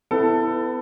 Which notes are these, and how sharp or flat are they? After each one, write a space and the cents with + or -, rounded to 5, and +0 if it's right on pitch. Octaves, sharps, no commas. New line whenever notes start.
B3 +35 E4 +0 A4 +15